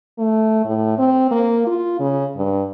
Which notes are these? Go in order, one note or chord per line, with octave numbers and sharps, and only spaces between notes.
A3
A2
C4
A#3
F4
C#3
G2